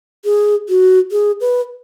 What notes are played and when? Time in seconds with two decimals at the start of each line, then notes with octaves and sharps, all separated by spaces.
0.25 G#4
0.69 F#4
1.12 G#4
1.41 B4